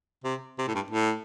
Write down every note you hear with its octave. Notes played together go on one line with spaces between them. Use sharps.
C3
C3
A2
G2
A2